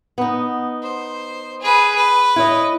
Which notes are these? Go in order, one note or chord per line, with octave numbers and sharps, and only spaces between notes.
B3 D#4
C5
G#4 B4
B4
E4 C#5 D#5